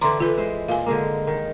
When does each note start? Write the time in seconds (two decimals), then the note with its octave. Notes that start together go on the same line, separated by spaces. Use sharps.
0.01 D3 E3 D5 A#5 C6
0.20 E3 F4 A4 B4
0.38 G#3 E4 C5
0.68 A#2 F5 G#5
0.86 D3 G#3 A#3
1.27 D#3